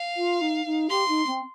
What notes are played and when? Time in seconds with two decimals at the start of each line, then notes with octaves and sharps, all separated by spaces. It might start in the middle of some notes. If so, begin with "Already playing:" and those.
Already playing: F5
0.16 F4
0.41 D#4
0.66 D#4
0.89 G4 C6
1.08 D#4
1.26 C4